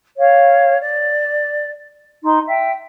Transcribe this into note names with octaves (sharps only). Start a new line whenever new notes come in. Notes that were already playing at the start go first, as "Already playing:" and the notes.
C#5 F5
D5
D#4 C6
E5 G5